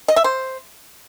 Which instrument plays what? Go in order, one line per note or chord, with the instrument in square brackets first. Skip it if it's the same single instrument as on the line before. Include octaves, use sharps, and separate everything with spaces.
[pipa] D#5
E5
C5